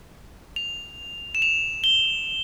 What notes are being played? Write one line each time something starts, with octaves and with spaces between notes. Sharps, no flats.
F7
E7
F7
G7